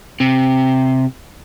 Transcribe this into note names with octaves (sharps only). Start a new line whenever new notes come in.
C3